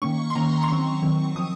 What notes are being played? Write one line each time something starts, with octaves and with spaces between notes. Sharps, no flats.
D#3 A#3 C#4 C#6
C6
D#3 A#3 C#4 A#5
C6
D#3 F#3 C4 C#6
D#3 F#3 C4
F3 C4 D#6